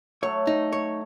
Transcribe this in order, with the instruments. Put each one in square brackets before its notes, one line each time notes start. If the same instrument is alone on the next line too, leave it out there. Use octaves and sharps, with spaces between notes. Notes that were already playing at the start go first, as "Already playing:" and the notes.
[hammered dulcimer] F#3 A3 [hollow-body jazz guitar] C#5
[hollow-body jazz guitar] D#4
C#5